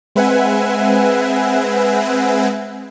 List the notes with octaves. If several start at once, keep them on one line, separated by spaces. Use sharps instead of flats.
G#3 C4 B4 E5 F#5 G#5